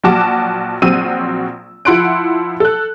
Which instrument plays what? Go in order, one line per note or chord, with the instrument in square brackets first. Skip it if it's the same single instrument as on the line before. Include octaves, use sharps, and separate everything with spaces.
[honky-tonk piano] A#1 F#3 F#4 A5 D6 E7
A#1 F#3 C4 E6 D#7
F3 E4 F#5 C6 F#6 D7
A4 F#6